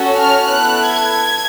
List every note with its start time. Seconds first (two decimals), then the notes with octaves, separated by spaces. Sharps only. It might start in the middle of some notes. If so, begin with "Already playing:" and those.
Already playing: C#4 F#4 A4
0.19 F6
0.47 B3 E4 A4 F#6
0.90 G#6